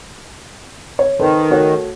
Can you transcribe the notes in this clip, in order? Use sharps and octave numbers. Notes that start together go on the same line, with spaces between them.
C#5
D#3 A4 B4 C5
A3 F#4 C#5